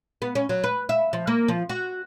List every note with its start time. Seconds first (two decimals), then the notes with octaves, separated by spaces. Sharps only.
0.22 B3
0.35 C#4
0.49 F#3
0.64 B4
0.89 E5
1.13 F3
1.27 A#3
1.48 F3
1.69 F#4